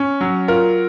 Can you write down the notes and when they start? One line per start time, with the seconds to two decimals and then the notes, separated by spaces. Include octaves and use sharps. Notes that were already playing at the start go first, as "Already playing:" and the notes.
Already playing: C#4
0.21 F#3
0.48 F4 A#4